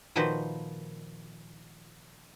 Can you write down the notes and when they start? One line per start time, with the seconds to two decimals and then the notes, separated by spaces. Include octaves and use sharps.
0.16 A#2 D#3 F3 F#4 B4 C5